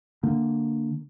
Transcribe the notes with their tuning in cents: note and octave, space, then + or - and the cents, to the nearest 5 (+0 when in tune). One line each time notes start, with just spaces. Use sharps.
D3 +0 A#3 -10